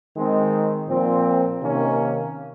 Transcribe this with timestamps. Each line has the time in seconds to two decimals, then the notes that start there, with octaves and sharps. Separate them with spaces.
0.16 D#3 G#3 C4
0.89 A#2 F3 C4
1.61 C3 D#3 A#3 C#4